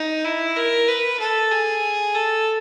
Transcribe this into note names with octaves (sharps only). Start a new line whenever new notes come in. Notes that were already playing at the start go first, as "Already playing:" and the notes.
Already playing: D#4
E4
A#4
B4
A4
G#4
A4